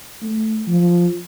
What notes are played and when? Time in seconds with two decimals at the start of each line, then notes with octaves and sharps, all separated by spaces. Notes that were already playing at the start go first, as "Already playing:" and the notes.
0.22 A3
0.68 F3